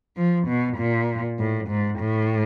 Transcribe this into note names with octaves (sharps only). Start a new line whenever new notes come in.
F3
B2
A#2
A2
G#2
A2